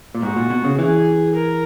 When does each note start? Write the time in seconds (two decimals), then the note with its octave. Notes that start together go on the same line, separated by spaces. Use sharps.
0.15 A#2
0.22 G#2 F#4
0.36 A#2
0.50 B2
0.65 C#3
0.78 E3 G#4
1.35 A#4